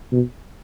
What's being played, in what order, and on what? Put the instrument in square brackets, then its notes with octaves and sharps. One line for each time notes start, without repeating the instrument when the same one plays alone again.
[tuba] B2